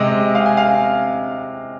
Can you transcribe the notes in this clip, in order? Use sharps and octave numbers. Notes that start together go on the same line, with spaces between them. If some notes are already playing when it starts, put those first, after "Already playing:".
Already playing: C3 G#3 D#5
F5
G#5
F5